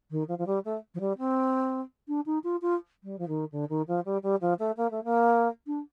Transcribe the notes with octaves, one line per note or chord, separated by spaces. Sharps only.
D#3
F3
F3
G3
A3
F3
G3
C4
D4
D#4
F4
F4
G3
F3
D#3
D3
D#3
F3
G3
G3
F3
A3
A#3
A3
A#3
D4